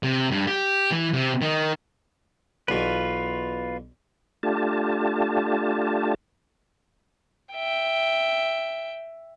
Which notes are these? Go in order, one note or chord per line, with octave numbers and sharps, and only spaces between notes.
C3
G2
G4
E3
C3
D#3
B1 E2 B2 F4 B4
A3 D4 F4 G4 A5
E5 G5